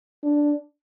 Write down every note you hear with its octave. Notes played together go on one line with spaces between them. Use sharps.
D4